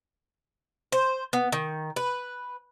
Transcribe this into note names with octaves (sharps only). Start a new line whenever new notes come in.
C5
B3
D#3
B4